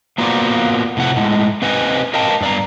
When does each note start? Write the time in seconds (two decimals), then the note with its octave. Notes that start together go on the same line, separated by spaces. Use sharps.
0.18 A#3 B3 F4 F#4 C5 D5
0.97 A2 C3 F#5
1.16 A2 G#3
1.62 C4 D#4 B4 C5 D#5 G#5
2.14 A#4 D#5 F5 G5 A5
2.41 G2 D5 A#5